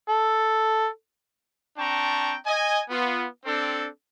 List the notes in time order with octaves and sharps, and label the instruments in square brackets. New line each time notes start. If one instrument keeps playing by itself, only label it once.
[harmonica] A4
[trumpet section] C4 D4 G5 A5 A#5 C#6
D#5 G#5
B3 F4
C4 D4 A4